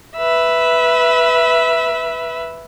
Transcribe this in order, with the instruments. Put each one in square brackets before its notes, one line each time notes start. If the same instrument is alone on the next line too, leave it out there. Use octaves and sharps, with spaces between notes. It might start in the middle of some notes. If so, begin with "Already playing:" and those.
[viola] B4 E5